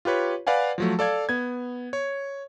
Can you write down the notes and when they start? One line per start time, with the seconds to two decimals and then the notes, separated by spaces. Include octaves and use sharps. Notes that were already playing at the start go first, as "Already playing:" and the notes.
0.05 F4 G4 B4 C#5
0.47 B4 D5 F5 F#5 G#5
0.78 F3 F#3 A3
0.99 A4 D5 F5 G#6
1.29 B3 G#6
1.93 C#5